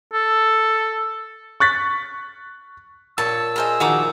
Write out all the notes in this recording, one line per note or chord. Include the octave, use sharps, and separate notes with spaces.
A4
C#6 F#6 A6 B6
A#2 C#5 A5 E6
G#4 A#4 C5 D#5
D#3 F3 F#4 A#5 D6